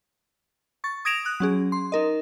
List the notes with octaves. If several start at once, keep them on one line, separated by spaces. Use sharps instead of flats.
C#6 A6
D#6 G#6 A#6 D7 E7 F7
D#6 F#6
F#3 C#4 G#4
C6
D#4 A#4 D#5